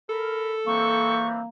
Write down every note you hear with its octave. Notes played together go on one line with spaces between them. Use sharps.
A4 A#4 B5
E3 G3 A#3 C4 C#6